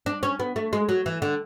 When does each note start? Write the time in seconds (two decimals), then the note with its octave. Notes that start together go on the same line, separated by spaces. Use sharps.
0.06 D4
0.23 C#4
0.40 B3
0.56 A3
0.73 G#3
0.89 F#3
1.06 E3
1.22 D3